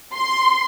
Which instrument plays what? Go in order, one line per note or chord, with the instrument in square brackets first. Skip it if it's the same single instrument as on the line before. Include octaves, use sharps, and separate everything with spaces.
[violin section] C6